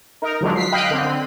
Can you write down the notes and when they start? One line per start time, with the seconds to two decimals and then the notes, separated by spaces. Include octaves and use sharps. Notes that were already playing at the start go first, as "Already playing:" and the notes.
0.22 D#4 A#4
0.41 D3 F3 F#3 G#3 D4
0.56 B6 C7
0.72 D#5 F5 G5 B5 F#6
0.90 D3 C4